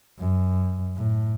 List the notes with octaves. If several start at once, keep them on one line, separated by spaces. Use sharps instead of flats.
F#2
A2